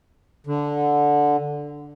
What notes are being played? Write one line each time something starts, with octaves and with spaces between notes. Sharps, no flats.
D3